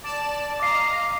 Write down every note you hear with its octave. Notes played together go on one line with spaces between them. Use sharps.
D5 A5 E7
D#5 F5 A#5 D6 C7